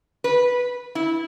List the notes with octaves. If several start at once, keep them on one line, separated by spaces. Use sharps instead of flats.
B4
E4